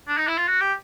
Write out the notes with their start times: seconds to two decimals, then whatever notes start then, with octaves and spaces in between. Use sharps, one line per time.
0.07 D4
0.18 D#4
0.28 E4
0.38 F4
0.47 F#4
0.61 G4